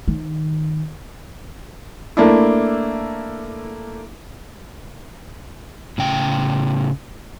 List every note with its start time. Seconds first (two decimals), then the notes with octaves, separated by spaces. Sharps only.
0.08 D#3
2.17 A3 A#3 D4 E4
5.98 A2 C#3 G5